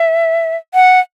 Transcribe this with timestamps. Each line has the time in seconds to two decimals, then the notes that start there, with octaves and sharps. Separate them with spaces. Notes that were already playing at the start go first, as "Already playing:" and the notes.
Already playing: E5
0.74 F#5